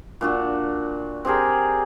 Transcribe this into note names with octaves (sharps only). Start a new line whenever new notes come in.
A#2 D4 F#4
C4 G4 G#4 A#4